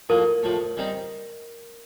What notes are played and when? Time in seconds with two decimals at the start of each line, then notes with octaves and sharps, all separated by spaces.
0.09 A2 F3 A#3 A#4
0.43 A2 F3 A3
0.77 D#3 G3 C4 D#4